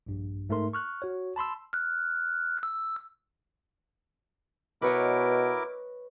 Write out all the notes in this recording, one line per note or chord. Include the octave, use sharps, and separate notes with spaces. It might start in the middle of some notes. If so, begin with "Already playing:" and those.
A#1 G2
G#2 A3 D#4 A#4 C6
C#6 F6 F#6
F#4 C#5
A5 B5 C6 E6
F6 F#6
E6
B2 E4 A#4 B4 C#5 D#5 D6